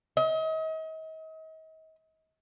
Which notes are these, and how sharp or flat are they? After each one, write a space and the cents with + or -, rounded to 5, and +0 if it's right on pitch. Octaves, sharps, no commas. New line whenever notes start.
D#5 +40